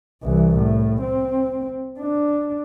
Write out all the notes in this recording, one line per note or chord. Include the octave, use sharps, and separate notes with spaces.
C2 E3
A2
C4
D4